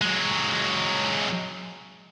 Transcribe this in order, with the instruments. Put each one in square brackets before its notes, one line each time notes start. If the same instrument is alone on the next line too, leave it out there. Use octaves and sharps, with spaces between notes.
[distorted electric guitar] F#3 G#3